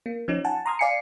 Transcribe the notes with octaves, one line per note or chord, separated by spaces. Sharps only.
A#3
F3 C#4 D#4
F#5 G#5 A5
A#5 C6 D#6 F6 G#6
D5 F5 G#5 C7 C#7